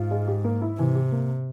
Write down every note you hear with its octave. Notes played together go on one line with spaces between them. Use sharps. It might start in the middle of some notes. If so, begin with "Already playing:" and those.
Already playing: G#2 F4
G#3
G4
A#3
E4
C3 E3
G4
A#3